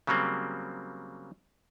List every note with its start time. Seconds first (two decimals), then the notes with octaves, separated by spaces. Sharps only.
0.07 C#3 F#3 G3 A#3 C4